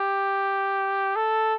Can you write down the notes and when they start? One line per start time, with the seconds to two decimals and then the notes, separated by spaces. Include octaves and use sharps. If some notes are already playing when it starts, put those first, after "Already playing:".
Already playing: G4
1.16 A4